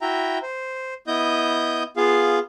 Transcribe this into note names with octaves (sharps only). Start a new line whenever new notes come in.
E4 F#4 E5 G5 A#5
C5
B3 E4 D#5 D#6 G6
B3 F4 G#4 F5